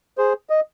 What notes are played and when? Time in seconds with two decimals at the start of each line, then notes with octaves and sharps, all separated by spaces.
0.18 G#4 C5
0.50 D#5